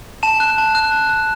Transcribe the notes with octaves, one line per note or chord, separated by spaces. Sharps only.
A5 E7
F#6
A5
F#6
A5
F#6